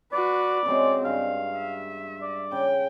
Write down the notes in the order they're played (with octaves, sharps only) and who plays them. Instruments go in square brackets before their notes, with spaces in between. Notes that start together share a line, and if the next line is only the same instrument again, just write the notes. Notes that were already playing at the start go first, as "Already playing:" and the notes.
[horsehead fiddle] F#4 B4 [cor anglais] D5
[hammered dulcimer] C#3 G#3 F#4 [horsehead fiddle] C4
[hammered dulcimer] G2 [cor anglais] F5
[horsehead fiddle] E5
[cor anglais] D5
[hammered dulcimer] C#3 [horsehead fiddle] G5